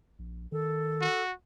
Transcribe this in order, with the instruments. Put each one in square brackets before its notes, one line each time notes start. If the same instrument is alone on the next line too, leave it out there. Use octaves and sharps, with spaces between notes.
[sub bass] A#1
[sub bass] D#3 [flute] A4
[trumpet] F#4